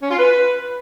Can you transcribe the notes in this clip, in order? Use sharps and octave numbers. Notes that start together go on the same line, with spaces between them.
C#4
F4
B4